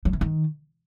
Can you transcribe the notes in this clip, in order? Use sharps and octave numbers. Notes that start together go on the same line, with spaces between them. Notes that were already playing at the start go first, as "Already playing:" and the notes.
F#3
E3
D#3